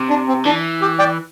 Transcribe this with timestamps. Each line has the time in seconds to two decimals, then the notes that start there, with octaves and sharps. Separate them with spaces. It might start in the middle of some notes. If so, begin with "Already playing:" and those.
Already playing: C3
0.10 D4
0.28 C4
0.45 E3 D4
0.81 G4
0.99 D5 G5